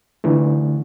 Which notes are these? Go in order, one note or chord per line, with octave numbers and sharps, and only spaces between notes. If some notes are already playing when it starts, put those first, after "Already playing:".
D3 E3 A3